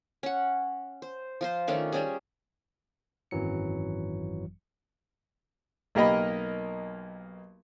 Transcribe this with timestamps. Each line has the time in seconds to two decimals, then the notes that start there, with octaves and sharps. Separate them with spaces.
0.23 C#4 F#5
1.02 C5
1.41 F3 F4 C5
1.68 D#3 A3 C#4 D4
1.92 G3 C#4 G#4
3.31 G#1 F#2 E3 F#3 C#7
5.95 B1 A#3 G4 A#4 D#5 B5